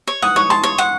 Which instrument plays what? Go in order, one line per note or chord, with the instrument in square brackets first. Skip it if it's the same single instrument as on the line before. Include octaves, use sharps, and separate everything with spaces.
[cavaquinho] C#5
[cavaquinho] F#5 [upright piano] D#6
[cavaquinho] C#5 [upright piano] C#6
[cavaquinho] A5 [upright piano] C6
[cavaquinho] C#5
F#5